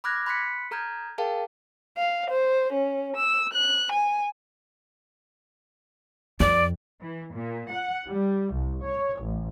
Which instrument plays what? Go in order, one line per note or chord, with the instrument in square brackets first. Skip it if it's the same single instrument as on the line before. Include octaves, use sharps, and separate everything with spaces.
[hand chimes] B5 D6 F6 F#6 G#6 A#6
B5 C6 F#6 B6 C#7
A4 A#5 F6 G6 G#6
G#4 A#4 F5 G5 A5
[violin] F5
C5
C#4
E6
F#6
G#5
[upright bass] F2 [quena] D5
[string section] E3
A#2
F#5
G3
C2
C#5
A1